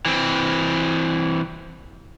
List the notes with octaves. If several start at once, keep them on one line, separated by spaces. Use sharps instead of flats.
E3 C4